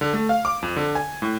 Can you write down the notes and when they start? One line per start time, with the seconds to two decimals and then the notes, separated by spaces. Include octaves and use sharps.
0.01 D3
0.13 A3
0.29 F5
0.45 D6
0.62 F2
0.76 D3
0.95 G#5
1.22 A2